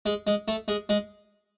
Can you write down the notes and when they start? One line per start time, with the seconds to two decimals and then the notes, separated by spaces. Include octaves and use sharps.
0.06 G#3
0.27 G#3
0.48 A3
0.68 G#3
0.89 G#3